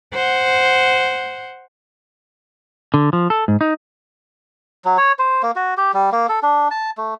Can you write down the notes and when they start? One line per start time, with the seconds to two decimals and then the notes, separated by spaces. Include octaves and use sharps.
0.14 C5 F#5
2.94 D3
3.13 F3
3.30 A4
3.48 G#2
3.61 D#4
4.85 F#3
4.98 C#5
5.19 C5
5.43 A#3
5.56 F#4
5.77 G4
5.94 G3
6.12 A#3
6.29 A4
6.43 D4
6.71 A5
6.98 A3